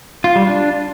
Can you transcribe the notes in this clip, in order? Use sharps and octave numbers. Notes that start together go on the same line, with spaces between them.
F4
G3
D4